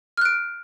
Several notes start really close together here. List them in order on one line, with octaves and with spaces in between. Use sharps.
F6 F#6 D7